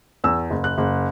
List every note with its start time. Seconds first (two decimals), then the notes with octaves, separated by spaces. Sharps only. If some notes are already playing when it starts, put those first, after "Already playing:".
0.24 E2 E6
0.50 F#1
0.64 F#6
0.78 F#1